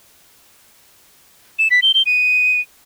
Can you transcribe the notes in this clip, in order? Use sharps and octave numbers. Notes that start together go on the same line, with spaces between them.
E7
B6
G7
G7
D#7